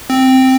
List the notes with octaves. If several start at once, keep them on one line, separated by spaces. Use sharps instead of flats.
C4